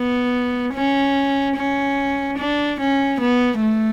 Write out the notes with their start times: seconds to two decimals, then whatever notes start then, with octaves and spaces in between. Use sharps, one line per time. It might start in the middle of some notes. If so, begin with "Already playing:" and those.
Already playing: B3
0.74 C#4
1.56 C#4
2.38 D4
2.80 C#4
3.21 B3
3.62 A3